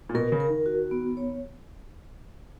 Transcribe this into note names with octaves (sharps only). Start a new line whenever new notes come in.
A#2
B2 A#4
C#3
A#4
D#3
F#4
B3
C#5